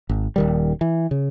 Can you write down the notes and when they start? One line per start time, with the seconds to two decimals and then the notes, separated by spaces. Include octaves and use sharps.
0.09 G#1
0.36 D#1 D#3 G3
0.81 E3
1.11 C#3